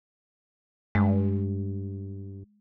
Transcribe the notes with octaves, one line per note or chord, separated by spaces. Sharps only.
G2 G#3